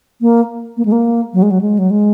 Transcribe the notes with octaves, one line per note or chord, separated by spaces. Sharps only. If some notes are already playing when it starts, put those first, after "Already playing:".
A#3
A#3
G#3
A#3
F#3
G#3
F#3
G#3
F#3
G#3